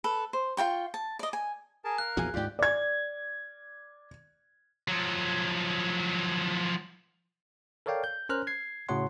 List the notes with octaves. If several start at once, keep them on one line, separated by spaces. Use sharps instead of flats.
A4 B4
C5
F4 A#4 G5 C#6
A5
D5 D#5
G#5
G#4 A#4 A5
A#4 F5 F#6
A#1 E2 F3 F#4 G#4 G#5
D2 G#2 F4 G4 D5 G5
D5 G#6
F3 F#3
A4 A#4 C#5 D5 F5 G5
G6
C#4 A#4 C5 A#5 F6 F#6
G#6 C7
A2 C#3 F#4 C#5 F#5 C6